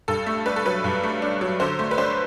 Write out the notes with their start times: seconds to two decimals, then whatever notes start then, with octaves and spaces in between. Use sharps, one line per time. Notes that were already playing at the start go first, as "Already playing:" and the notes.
0.08 G2 A4
0.26 A3
0.46 D4 B4
0.56 A4
0.65 F#3 B4
0.84 G2
1.03 A3
1.22 D4
1.41 F#3
1.60 D3 C5
1.79 A3
1.91 B4
1.98 D4 C5